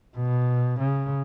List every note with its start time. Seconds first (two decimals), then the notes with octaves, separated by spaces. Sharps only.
0.17 B2
0.79 C#3